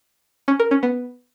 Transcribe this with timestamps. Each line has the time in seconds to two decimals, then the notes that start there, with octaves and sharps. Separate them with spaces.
0.48 C#4
0.59 A#4
0.71 C#4
0.83 B3